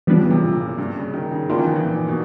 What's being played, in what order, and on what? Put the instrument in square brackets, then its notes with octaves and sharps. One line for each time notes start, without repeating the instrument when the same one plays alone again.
[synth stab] E3 G3 B3 D4 [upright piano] F3
[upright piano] C#3
C3
A#2
A#2
G2
C#3
D#3
C#3
[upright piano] D#3 [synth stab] A#3 D4 F4
[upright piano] E3
F3
E3
A#2
A#2
B2